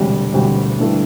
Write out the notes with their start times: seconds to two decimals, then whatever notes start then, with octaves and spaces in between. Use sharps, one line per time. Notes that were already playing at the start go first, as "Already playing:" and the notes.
Already playing: E1 D2 C3 G3
0.33 E1 D2 C3 G3
0.79 G2 D3 A3 E4 A4